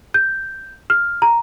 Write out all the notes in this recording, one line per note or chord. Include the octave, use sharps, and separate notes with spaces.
G6
F6
A#5